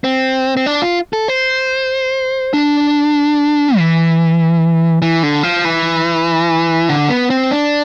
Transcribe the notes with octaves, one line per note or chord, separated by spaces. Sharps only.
C4
C4
D4
F4
A4
C5
D4
E3
E3
D3
F3
E3
D3
B3
C4
D4